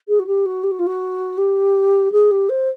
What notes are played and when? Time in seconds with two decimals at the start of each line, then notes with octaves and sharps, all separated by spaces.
0.08 G#4
0.19 F#4
0.27 G4
0.46 F#4
0.63 G4
0.71 F#4
0.79 F4
0.87 F#4
1.38 G4
2.12 G#4
2.31 G4
2.49 C5